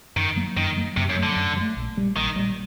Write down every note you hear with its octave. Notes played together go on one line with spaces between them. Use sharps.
F#2 D#3
F#3 A#3
F#2 D#3
F#3 A#3
F#2 C3
F#2
F#3 A3
D3
F#2
F#3
A3
A#1
A#2 G3
A#1 D#3
A#2 G3